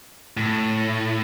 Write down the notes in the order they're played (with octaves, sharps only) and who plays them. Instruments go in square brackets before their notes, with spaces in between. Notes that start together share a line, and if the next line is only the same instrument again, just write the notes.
[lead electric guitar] A2